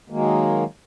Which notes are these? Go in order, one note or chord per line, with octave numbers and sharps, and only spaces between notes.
D#3 F#3 G#3 A#3